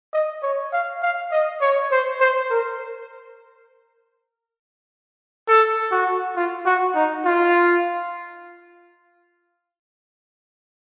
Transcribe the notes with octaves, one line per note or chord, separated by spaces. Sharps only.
D#5
C#5
F5
F5
D#5
C#5
C5
C5
A#4
A4
F#4
F4
F#4
D#4
F4